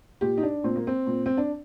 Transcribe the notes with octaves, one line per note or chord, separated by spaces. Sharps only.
A#2 G4
D#4
D4
A#2 C4
A#3
C4
A#2
C4
D4